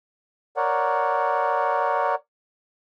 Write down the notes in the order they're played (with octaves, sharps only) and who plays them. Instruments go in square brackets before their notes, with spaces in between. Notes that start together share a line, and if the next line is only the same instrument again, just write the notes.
[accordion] A#4 C#5 D5 F#5